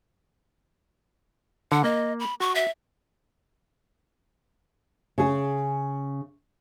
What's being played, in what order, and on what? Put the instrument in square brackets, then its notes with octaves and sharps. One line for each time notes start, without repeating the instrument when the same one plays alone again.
[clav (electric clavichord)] D3 [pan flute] F#5
[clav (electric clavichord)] A#3 [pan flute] D#5
[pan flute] B5
[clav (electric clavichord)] F#4 [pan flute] C#6
[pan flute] E5
[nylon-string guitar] C#3 G#4